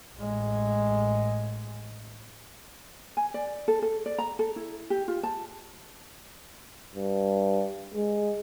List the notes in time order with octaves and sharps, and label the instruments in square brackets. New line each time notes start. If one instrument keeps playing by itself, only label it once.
[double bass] A1 G#3
[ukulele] G#5
D5
A4
A4
D5
A#5
A4
E4
G4
F4
A5
[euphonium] G2
G#3